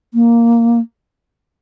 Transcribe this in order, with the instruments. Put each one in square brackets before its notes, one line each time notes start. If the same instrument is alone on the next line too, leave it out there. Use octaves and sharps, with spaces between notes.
[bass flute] A#3